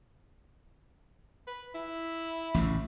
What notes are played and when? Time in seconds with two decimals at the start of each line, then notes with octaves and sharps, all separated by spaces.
1.47 B4
1.75 E4
2.54 A1 A2 C#3